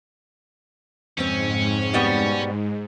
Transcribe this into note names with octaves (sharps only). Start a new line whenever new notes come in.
F2 G#2 C#3 C4 C#4
B2 G3 B3